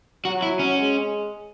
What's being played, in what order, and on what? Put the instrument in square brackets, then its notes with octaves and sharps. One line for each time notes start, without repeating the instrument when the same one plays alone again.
[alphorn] F#3 [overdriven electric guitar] F#4
[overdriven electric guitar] E4
C#4
[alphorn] G#3